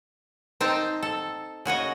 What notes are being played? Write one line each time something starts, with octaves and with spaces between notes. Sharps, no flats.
C4 D#4 G5 A5 A#5
A4
C#3 F#4 C#5 D#5